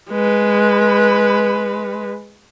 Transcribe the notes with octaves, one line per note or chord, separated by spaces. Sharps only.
G#3 B4